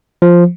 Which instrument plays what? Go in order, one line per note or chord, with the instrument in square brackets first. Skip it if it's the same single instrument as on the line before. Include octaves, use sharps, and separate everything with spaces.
[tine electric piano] F3